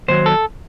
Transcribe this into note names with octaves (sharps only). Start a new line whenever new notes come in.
D#2 D#3 F#3 C5
A4